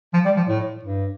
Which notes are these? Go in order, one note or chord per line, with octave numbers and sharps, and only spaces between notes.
F3
G3
F3
A2
G2